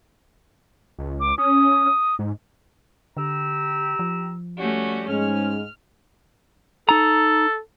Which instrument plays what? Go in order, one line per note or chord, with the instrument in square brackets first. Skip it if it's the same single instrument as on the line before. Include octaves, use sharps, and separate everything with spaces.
[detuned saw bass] C#2
[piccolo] D6
[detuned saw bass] C#4 [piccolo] D#6
[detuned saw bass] G#2
[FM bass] D3 [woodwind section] G4 A#5 E6
[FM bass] F3
[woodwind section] G3 G4 [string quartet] A3 C#4 F#4
[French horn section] G#2 G#3 [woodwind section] C#4 [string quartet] F6
[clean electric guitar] D#4 A#5 [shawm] A4